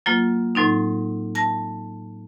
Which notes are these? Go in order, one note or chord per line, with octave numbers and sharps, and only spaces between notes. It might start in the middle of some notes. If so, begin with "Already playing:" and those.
F#3 A#3 F4
A2 F#3 C4 D#4
A5 A#6